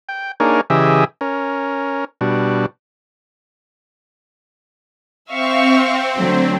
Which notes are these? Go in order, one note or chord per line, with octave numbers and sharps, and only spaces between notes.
G5
A#3 D4 D#4 G#4 A#4 C#5
C#3 E3 G4 G#4 D#5 E5
C#4 A#4
B2 G3 D4 F#4
C4 E5 F5 C#6
D3 F#3 A3